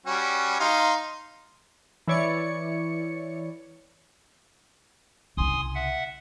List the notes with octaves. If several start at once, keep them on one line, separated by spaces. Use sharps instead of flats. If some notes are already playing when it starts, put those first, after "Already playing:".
G3 C#4 F#4
D#4 F5 C6
E3 E4 C#5 D5 C#7
C2 C#3 G#5 C6 D#6
E5 F#5